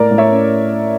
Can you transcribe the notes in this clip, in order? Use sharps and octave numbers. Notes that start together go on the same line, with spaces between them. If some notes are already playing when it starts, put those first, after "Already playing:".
Already playing: A2 A#4 D5
A2
C#5 E5
C#4